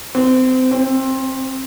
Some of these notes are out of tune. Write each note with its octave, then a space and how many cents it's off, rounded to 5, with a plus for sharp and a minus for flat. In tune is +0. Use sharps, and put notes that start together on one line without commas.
C4 -25
C4 +20